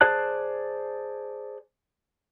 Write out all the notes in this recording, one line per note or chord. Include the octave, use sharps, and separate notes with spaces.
G#4 C5 D5 A5 F#6